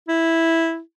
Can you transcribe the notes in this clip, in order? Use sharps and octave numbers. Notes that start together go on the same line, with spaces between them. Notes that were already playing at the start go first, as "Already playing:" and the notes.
E4